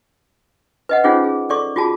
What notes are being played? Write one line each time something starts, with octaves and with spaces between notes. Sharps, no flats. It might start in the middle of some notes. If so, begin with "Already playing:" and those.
B4 D#5 F#5
C#4 D#4 F4 G#4 C5 F#5
G#4
A4 D5 C#6 D6
F4 F#4 G#4 A5